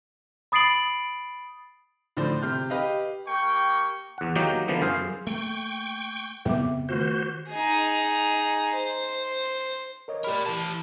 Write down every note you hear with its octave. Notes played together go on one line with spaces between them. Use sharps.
B5 D#6 A6 C7 D7 F#7
A2 D3 F3 C5 D5
C3 F6 G6
G4 B4 D#5 F5
A#3 G4 G5 C#6
E2 F#5
D#3 F#3 A#3 D#4 F#4 G4
D3 E3 F3 A#3 B3
F#2 G#4 C5 F5
A3 A#3 G5 C#6
F2 C#3 B3 C4 E5 D6
D#3 A3 F4 F#4 C5
D#4 G#4
C5
A#4 C#5 D#5
G4 A#4 D5 B5
E3 A5